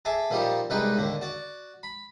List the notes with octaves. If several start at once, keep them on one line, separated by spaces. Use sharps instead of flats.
G#4 A4 D5 E5
A#2 F3 G3 D#4 G4
C2 G3 G#3 D#4 B4 G5
D#2 A2 D3
F#4 D5
B5